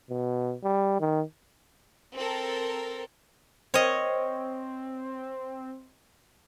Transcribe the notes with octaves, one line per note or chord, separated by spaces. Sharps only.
B2
G3
D#3
C4 A4 A#4
C4 C5 C#5 D#5 G5 F6